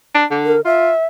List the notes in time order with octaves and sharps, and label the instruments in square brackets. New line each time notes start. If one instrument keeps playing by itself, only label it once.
[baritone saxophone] D4
D3
[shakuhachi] A#4
[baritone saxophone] F4 [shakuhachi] E5